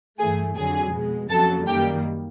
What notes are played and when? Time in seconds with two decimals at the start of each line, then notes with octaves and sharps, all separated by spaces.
0.19 G2 E3 A3 G#4 G#5
0.55 F2 D3 F#3 G#4 G#5
0.92 B2 G#3
1.29 F2 C#3 F#3 A#3 A4 A5
1.66 F#2 D#3 G3 A#3 G4 G5